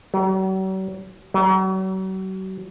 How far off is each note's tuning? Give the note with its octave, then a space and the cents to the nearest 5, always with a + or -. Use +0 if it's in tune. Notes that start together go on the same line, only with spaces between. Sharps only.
F#3 +45
F#3 +40